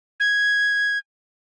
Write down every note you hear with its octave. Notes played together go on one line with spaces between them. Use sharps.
G#6